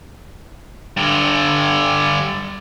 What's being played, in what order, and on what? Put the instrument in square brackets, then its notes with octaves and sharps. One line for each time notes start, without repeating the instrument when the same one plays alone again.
[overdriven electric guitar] G2 D3